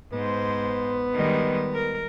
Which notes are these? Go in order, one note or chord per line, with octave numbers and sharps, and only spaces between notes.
G#2 B3 C5
D#3 G3 G#3
A#4